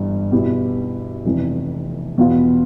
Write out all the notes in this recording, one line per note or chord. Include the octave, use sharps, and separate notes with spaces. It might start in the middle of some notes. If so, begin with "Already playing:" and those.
Already playing: G1 E3 G3
B2 B3 E4 G4
F1 F2 E3
E2 B2 B3 F4